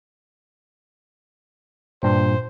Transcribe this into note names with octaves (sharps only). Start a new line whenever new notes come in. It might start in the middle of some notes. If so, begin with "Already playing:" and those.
G2 A#2 C5